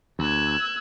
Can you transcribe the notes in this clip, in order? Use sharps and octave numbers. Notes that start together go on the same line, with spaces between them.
D2 E6 F#6 G#6